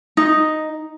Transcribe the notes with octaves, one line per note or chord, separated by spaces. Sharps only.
D#4